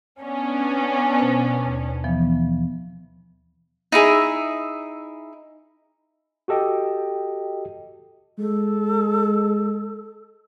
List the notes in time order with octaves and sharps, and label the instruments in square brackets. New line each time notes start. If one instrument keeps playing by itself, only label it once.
[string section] B3 C#4 D4
[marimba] B2 C5
D#2
E3 F3 B3
[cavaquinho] D#4 E4 G#4 E5
[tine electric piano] F#4 G4 A4 D#5 G5
[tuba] G#3 [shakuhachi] A4